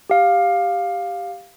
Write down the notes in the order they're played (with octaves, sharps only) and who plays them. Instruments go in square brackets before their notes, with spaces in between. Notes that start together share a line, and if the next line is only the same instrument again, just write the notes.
[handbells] G4 F5